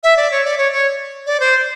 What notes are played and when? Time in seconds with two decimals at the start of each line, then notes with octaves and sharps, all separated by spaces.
0.03 E5
0.17 D5
0.31 C#5
0.44 D5
0.58 C#5
0.72 C#5
1.26 D5
1.40 C5